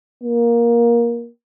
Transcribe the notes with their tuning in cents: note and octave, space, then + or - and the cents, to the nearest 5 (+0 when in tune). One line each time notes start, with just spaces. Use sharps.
A#3 +15